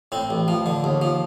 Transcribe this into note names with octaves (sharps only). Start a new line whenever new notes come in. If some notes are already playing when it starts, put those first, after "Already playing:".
A2 C4
A1
F3
D3
D#2
F3